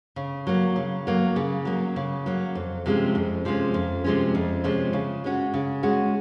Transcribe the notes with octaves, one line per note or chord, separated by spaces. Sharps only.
C#3
F#3 A#3
C#3
F#3 A#3
C#3
F#3 A#3
C#3
F#3 A#3
F2
C3 F3 G#3 C#4
F2
C3 F3 G#3 C#4
F2
C3 F3 G#3 C#4
F2
C3 F3 G#3 C#4
C#3
G#3 C#4 F#4
C#3
G#3 C#4 F#4